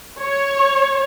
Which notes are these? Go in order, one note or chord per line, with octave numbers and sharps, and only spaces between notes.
C#5